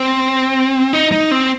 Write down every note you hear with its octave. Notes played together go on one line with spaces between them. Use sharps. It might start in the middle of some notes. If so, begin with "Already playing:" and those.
Already playing: C4
D#4
D#4
C4